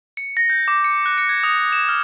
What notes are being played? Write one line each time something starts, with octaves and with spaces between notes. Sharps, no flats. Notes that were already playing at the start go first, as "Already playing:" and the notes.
C#7
A#6
G6
D6
C#7
F#6
C#7
G#6
D#6
D#6
E7
F6